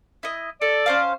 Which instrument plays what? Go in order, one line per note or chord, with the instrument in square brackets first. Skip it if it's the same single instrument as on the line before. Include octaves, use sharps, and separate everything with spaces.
[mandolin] E4 D#5
[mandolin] A4 [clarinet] D5
[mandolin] C#4 C5 F5